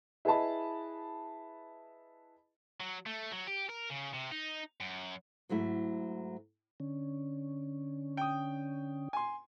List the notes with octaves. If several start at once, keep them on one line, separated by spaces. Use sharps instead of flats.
E4 G#4 B4 D#5 A5 B5
F#3
A3
F#3
G4
A#4
C#3
C3
D#4
F#2
G#2 F#3 A3 E4
D3 C#4
G5 D#6
G#5 C6